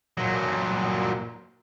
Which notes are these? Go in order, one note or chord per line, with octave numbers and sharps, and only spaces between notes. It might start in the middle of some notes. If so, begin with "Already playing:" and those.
A#2 F#3